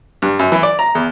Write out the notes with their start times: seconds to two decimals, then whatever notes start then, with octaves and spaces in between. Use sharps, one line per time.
0.22 G2
0.39 F#2
0.52 E3
0.63 D5
0.79 A#5
0.95 E2